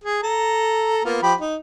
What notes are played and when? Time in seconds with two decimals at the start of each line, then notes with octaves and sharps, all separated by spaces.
0.04 G#4
0.23 A4 A#5
1.05 A#3 B3 F4
1.23 F3 G4 B5
1.41 D#4